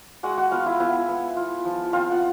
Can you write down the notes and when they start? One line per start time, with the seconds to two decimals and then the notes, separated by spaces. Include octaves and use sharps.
0.23 G#3 F#4 F#5
0.38 F#4 F#5
0.51 B3 F4 F5
0.66 E4 E5
0.80 B3 E4 E5
1.08 B3
1.37 F4
1.65 F3
1.93 C4 F4 F5
2.12 F#5